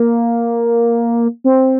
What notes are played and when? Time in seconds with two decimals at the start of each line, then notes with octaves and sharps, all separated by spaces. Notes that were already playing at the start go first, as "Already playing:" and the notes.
Already playing: A#3
1.44 C4